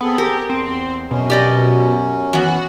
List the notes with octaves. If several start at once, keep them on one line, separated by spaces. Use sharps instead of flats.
B3 C4 G#4 A4
G4 A#4
E2 C4
F#2 B2 C#4
G4 D5 D#5
E3 B3 F#4